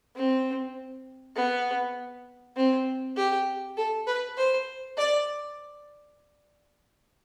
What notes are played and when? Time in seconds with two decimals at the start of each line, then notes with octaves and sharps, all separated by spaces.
0.16 C4
1.36 B3
2.56 C4
3.17 G4
3.77 A4
4.07 B4
4.37 C5
4.97 D5